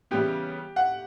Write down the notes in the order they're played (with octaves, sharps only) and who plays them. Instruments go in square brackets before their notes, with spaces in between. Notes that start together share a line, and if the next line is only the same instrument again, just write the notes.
[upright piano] C#3 E3 G3 B3 [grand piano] G4
[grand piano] F#5